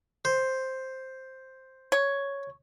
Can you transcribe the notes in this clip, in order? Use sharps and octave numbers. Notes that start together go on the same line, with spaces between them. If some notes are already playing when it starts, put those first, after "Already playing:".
C5
C#5